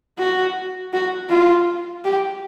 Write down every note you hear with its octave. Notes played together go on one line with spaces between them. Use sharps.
F#4
F#4
F4
G4